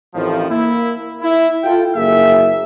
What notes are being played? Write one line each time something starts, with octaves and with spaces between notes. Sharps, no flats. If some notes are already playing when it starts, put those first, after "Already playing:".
A1 F2 A2 D#3 F3
A#3 E4
E4
F4 A4 G5
F#1 A#3 G#4 E5